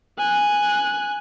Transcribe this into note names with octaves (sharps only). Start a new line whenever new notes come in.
G#5 F#6